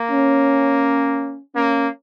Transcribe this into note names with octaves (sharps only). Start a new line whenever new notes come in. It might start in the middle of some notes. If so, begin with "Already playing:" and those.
Already playing: A#3
C#4
A#3 C#4